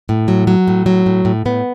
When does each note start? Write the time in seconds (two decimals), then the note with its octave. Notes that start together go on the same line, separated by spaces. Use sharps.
0.09 A2
0.28 F#3
0.47 F#3
0.68 A2
0.86 F#3
1.06 A2
1.25 A2
1.45 A2 B3